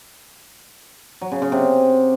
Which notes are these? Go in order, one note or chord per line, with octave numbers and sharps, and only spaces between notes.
F#3
C#3
C#3
C3